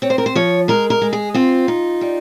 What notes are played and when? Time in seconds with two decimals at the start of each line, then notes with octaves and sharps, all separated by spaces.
0.02 C4 C#5
0.10 C5
0.18 A#4
0.26 C5
0.35 F3 C#5
0.68 G#3 A#4
0.90 A#4
1.02 G#3
1.13 G#4
1.34 C4 F4
1.68 D#4
2.01 G3